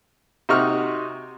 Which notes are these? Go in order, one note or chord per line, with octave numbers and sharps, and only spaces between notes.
C3 D#4 F#4 C#6 F6